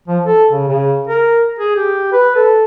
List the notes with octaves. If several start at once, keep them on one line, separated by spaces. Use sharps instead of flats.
F3
A4
C#3
C#3
A#4
G#4
G4
B4
A4